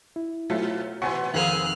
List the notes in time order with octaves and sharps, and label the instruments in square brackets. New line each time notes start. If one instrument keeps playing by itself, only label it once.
[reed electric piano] E4
[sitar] B2 [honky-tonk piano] F#3 A3 F4
[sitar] B2 E3 [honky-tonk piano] F#5 G#5 C6 [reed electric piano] C#6
[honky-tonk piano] F1 [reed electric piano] D#3 [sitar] A#3 C4 G#4 [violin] F6 F#6